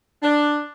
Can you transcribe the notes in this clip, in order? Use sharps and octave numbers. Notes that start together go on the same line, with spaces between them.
D4